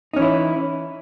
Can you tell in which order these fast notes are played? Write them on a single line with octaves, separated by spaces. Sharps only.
D#4 C#4 E3 E4